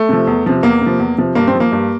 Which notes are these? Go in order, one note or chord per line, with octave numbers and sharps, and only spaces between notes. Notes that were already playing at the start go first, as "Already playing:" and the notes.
Already playing: A3
C3 F3
E2
C3 F3
E2 A#3
C3
F3
E2
C3 F3
G2 A#3
C4
F3
A#3
G2